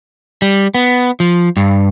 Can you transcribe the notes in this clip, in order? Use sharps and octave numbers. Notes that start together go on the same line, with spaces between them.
G3
B3
F3
G2